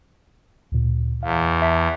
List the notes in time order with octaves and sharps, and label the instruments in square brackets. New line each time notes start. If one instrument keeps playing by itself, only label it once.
[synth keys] D2 A#2
[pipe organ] E2 [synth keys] F5
[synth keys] E5 A5 B6